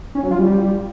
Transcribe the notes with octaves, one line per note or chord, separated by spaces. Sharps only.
C#4
F#3
F4
G3